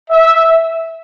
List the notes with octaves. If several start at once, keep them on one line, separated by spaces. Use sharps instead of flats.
E5